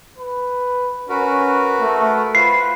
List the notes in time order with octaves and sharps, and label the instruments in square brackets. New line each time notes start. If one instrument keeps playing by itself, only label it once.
[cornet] B4
[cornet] C#4 [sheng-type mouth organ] F#4 A#4 B4
[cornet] A3
[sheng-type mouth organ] F4 B4 C5 [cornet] B5 [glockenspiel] C7